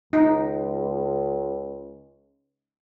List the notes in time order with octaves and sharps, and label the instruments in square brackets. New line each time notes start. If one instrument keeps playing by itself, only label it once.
[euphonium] C#2 [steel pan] D#4